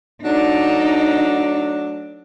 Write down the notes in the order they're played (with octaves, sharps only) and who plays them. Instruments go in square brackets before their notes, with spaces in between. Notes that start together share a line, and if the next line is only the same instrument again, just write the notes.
[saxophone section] F#3 A3 D4 [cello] D#4